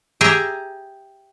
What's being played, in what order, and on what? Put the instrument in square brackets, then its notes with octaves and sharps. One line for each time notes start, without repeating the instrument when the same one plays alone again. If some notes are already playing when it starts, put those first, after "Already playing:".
[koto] G4 G#4 E5 A#5